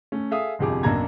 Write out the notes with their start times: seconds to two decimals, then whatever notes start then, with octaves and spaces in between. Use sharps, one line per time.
0.12 A3 C#4
0.31 G#4 A4 E5 F5 D#6
0.59 G1 C2 F2 G4 G#4 D6
0.83 B1 F#2 A#3 D4 A#5 G#6